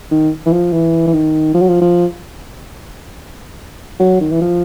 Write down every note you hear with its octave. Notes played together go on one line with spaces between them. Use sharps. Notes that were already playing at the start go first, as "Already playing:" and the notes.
D#3
E3
F3
E3
E3
D#3
F3
F#3
F3
F3
F#3
D#3
E3
F3